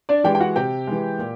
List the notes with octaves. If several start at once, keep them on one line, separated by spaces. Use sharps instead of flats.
D4 D5
E3 G#3 G4 G5
G5
F#4 F#5
C3 G4 G5
E3 G#3
A#2